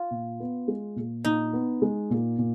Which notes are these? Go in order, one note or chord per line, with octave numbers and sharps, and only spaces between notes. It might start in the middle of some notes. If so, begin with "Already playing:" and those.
Already playing: F4
A#2
B3
G#3
A#2
A#2 D#4
B3
G#3
A#2
A#2